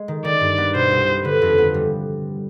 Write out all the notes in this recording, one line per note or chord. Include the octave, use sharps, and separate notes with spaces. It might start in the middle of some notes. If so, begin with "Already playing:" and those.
Already playing: G#3
D#3
D#3 D5
G2
B3
B2 C5
C2
B3
D3 B4
F2
B3
G3